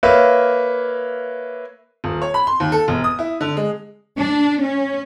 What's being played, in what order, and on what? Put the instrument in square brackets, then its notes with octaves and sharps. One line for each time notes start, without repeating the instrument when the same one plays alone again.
[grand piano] A#3 B4 C#5 E5 F5
[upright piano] D#1
C#5
B5
C6
D#2
A4
E1
D#6
E4
D3
G#3
[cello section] D4
C#4